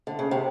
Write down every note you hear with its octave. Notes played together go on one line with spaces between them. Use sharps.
D3
C#3
C3